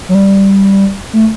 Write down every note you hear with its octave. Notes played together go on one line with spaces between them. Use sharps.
F#3
G3
A3